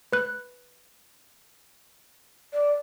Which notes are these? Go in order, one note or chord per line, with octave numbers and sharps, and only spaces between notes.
B4 F#6
D5